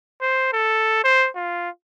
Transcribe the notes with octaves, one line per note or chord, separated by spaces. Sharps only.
C5
A4
C5
F4